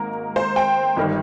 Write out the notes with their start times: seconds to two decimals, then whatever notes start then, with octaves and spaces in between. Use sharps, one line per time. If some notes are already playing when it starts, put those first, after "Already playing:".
Already playing: G#1 G#2 D#3 A#3 A#4
0.36 C5
0.56 G5
0.97 G1 D#3 G3